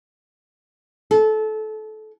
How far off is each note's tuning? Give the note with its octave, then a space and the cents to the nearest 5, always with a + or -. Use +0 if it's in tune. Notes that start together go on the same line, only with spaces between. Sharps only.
A4 -25